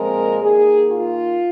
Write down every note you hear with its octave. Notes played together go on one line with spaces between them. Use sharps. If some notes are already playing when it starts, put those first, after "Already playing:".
Already playing: A#2 F3 G#3 C4 A#4
D#3 A#3 G#4
F4